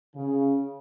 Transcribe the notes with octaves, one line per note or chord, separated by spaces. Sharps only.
C#3